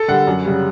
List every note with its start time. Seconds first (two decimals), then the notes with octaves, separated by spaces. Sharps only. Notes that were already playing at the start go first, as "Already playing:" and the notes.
Already playing: A4
0.08 D3 G3 F#5
0.27 F#2
0.45 C#3 G3